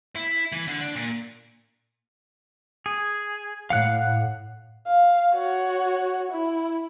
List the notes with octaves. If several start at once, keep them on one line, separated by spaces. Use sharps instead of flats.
E4
E3
D3
D4
A#2
G#4
A2 F5 F#5 F#6
F5
F#4 C#5
E4